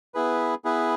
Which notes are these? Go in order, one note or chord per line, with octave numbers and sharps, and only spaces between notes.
B3 E4 G#4 B4
B3 E4 G#4 B4